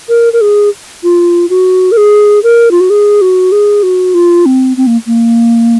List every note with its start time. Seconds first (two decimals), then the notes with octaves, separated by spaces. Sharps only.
0.09 A#4
0.33 A#4
0.41 G#4
1.03 F4
1.50 F#4
1.92 A#4
1.97 G#4
2.43 A#4
2.71 F4
2.80 F#4
2.90 G#4
3.21 F#4
3.52 G#4
3.83 F#4
4.14 F4
4.46 C4
4.77 C4
4.87 A#3
5.07 A#3